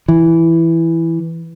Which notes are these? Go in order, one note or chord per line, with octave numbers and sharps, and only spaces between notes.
E3